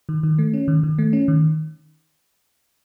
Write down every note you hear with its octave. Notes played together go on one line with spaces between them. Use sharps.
D#3
D#3
A3
C#4
D#3
D#3
A3
C#4
D#3